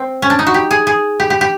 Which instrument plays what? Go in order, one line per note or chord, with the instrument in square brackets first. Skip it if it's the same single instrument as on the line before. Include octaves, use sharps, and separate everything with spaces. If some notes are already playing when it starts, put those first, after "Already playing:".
Already playing: [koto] C4
C#4
D4
D#4
F#4
G4
G#4
G#4
G4
G4
G4